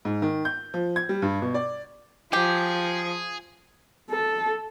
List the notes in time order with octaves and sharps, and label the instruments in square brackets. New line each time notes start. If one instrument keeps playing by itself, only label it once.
[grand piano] G#2
D#3
G6
F3
G#6
G3
G2
B2
D5
[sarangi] F3 [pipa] G4 [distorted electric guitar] G#4
[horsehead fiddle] A4